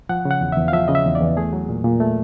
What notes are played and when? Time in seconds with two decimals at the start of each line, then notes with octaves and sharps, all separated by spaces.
0.09 F3 F#5
0.25 C#3
0.31 F#5
0.41 E2
0.52 E2 E5
0.68 F5
0.73 F3 E5
0.88 C#3 D#5
0.95 E5
1.06 E2
1.15 D5
1.21 E2
1.37 A3 G#4
1.53 F#3
1.69 A#2
1.84 A#2
2.00 A3